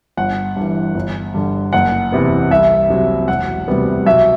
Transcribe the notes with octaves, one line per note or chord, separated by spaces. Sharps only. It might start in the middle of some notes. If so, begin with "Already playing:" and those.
G1 F#5
G2 E3
G1
G2 D3
F#1 F#5
E2 C3 E3 B3
C2 E5
C3 F#3
E1 F#5
D2 C3 G3 B3
B1 E5